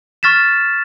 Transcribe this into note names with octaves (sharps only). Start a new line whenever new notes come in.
C#6 F6 A6 B6 E7